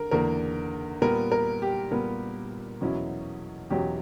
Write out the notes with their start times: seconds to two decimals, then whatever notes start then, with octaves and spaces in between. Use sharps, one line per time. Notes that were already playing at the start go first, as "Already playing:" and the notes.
Already playing: D3 A#4
0.11 E2 D3 A#3 A#4
1.01 A#2 G3 B3 A#4
1.32 A#4
1.62 G4
1.91 A#2 G3 B3 A#4
2.81 E2 B2 F#3 C#4 E4
3.70 E2 B2 F#3 C#4 E4 G4